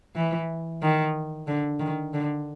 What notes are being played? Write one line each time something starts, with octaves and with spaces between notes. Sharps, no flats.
E3
D#3
D3
D#3
D3